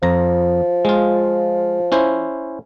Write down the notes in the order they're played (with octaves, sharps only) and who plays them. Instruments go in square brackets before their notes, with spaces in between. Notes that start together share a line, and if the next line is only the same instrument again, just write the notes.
[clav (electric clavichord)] F2 A#5 [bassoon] F3
[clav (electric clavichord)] G#3 F4
C#4 E4 C5